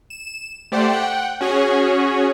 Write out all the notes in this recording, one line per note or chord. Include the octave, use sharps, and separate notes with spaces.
E7
A3 G4 C5 D5 F#5
F#5 G5
C#4 F#4 G#4 C#5